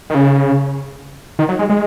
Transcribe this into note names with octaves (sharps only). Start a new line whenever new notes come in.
D#3
C#3
D#3
F#3
G#3
G#3